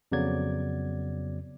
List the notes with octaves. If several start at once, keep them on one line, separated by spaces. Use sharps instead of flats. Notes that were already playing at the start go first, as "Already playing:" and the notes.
F2 C#3 F#3 B3 D5 G#6